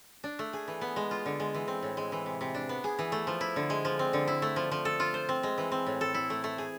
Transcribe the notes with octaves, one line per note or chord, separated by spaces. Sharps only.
D4
A3
G#4
E3
B3
G#3
F4
D3
G#3
E3
C4
A2
G#3
E3
C3
C3
D4
B3
G#4
E3
A3
F3
E4
D3
G#3
F3
C4
D3
E4
A3
F3
F3
A4
F4
C5
C4
G#3
E3
C4
A2
A4
E4
A3
A3
G#4